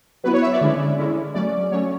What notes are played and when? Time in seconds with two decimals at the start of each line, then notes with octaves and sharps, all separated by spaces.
0.24 F#3 B3 E4 B4
0.34 C#5
0.42 E5
0.52 D5
0.61 D3 G#3 C#4 E4
0.98 D3 G#3 C#4 E4
1.34 F#3 A3 C#4 D5
1.72 F#3 A3 C#4 C#5